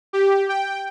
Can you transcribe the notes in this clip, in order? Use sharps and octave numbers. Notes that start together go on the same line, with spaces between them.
G4
G5